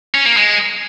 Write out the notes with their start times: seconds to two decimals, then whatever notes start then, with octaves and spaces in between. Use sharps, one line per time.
0.14 C#4
0.26 A#3
0.37 G#3